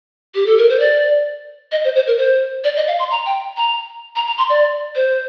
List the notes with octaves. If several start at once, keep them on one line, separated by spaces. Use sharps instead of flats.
G4
A4
A#4
C5
D5
D#5
C5
C5
A#4
C5
D5
D#5
F5
C6
A#5
G5
A#5
A#5
A#5
C6
D5
C5